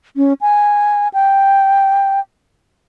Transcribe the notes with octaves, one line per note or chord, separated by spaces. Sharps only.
C#4
G#5
G5